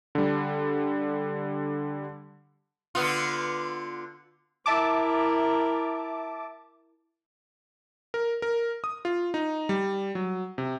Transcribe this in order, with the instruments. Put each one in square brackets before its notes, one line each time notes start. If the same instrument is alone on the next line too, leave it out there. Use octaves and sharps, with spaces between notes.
[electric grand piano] D3 G3
[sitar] D3 B3 F4
[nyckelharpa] E4 A#4 [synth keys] E5 A5 D6
[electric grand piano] A#4
A#4
D#6
F4
D#4
G3
F#3
C3